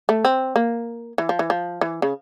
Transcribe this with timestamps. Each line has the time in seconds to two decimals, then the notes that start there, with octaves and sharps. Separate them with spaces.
0.09 A3
0.25 C4
0.56 A#3
1.18 E3
1.29 F3
1.39 E3
1.50 F3
1.81 E3
2.02 C#3